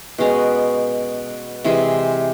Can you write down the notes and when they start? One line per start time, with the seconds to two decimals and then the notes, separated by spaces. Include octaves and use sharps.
0.18 B2 G#3 C#4
1.64 C3 E3 G#3